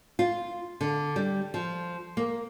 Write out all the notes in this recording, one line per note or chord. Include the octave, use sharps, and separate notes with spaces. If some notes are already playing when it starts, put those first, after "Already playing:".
F4
D3
G3
F3
A#3